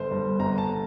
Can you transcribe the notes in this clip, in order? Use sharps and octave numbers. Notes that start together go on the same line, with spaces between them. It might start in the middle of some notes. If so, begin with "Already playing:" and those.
Already playing: G1 C5
G2
G1 A#5
A5